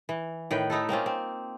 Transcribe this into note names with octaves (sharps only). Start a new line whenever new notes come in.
E3
A2 D#3 B4 G5
A3 D#4 E4 A4
A#3 C4 C#4 F4
C4